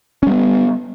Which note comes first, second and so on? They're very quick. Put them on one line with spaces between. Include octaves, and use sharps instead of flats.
C#4 G3 B3